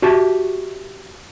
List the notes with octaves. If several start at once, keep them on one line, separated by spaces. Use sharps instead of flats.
F#4 G4 E5 A5